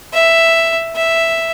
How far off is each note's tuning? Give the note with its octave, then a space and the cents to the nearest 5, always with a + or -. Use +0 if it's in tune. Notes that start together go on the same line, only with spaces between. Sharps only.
E5 +5
E5 +0